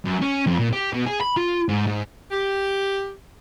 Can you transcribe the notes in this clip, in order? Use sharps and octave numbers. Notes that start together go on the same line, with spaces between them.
F#2
C#4
F2
A#2
G4
B2
G#4
B5
F4
G#2
G#2
G4